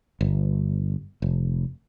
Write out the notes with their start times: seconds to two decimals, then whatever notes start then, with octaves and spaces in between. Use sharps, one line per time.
0.21 G1
1.22 F1